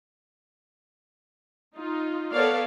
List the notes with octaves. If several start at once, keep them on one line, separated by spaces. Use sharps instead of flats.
D#4 F4
B3 A4 A#4 C#5 D5 F5